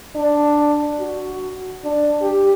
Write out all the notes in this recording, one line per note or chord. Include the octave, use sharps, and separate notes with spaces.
D4
F#4
D4
G4